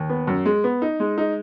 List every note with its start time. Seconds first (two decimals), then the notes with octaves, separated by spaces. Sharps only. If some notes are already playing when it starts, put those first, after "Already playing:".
Already playing: D#2
0.10 B3
0.27 F#2
0.46 G#3
0.64 B3
0.82 D#4
1.00 G#3
1.18 D#4